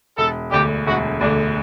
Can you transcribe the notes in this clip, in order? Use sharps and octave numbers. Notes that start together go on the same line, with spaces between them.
E1 A4
D2 D3 G4
E1 F#4
D2 D3 D4